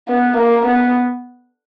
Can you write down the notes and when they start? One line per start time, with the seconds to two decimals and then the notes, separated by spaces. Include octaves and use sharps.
0.08 B3
0.37 A#3
0.66 B3